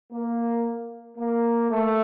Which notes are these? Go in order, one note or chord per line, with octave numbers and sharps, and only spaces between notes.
A#3
A#3
A3